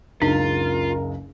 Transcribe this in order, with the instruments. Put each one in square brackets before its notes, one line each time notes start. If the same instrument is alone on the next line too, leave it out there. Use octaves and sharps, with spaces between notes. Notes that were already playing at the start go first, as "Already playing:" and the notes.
[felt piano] F#1 C#2 [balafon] D4 D#4 [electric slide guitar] F4 [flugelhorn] A#4